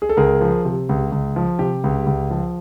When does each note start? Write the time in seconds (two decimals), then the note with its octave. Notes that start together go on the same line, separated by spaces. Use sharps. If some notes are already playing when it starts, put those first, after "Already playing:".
0.02 G#4
0.09 A4
0.17 C#2 G#4 A#4
0.41 F3
0.65 C3
0.89 C#2
1.12 C#2
1.36 F3
1.59 C3 G4
1.84 C#2
2.07 C#2
2.30 F3